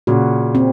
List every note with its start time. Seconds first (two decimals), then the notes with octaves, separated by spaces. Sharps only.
0.07 A#2 C#3 F#4
0.55 C4